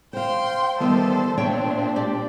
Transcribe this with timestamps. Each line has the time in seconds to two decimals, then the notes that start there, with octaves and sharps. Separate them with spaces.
0.13 C5 F5 G5 C6
0.80 D#3 E3 G3 B3 A4 C5
1.38 A#2 C4 D4 C#5 E5 G5
1.96 G4 D5